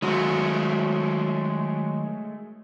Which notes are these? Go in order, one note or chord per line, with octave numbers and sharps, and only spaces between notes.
D#3 F#3 G#3 A3 F#4